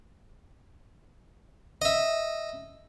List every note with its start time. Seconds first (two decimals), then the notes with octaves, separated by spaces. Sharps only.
1.82 D#5 E5